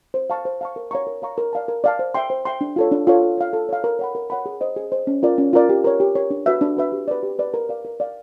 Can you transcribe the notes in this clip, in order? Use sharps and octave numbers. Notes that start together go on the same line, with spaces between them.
C5
F5 A5 C#6
C5
F5 A5 C#6
A#4
C#5 F5 A#5 C#6
A#4
C#5 F5 A#5 C#6
A#4
D5 F5 A5
A#4
D5 F5 A5
C5
E5 G5 C6
C5
E5 G5 C6
D4
F4 A4 C#5
D4
F4 A4 C#5
A4
C#5 F5
A4
C#5 F5
A#4
C#5 F#5 B5
A#4
C#5 F#5 B5
G#4
C5 D#5
G#4
C5 D#5
C#4
F4 A#4 D5
C#4
F4 A#4 D5
G4
A#4 C#5
G4
A#4 C#5
D4
F#4 B4 E5
D4
F#4 B4 E5
G4
B4 D5
G4
B4 D5
A#4
D5 F5
A#4
D5 F5